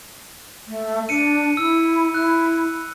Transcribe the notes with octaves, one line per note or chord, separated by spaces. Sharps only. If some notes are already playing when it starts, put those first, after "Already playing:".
A3
D4 C#7 D#7
E4 E6
E4 F#6